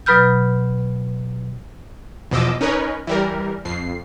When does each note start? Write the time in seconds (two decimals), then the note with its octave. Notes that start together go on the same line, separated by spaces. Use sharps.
0.06 B2 F#3 B4 B5 F6 G6
2.31 E2 B2 F3 D#5 D6 E6
2.61 C#4 D#4 A#4 B4 C#5
3.07 E3 G3 A#4
3.65 F2 C7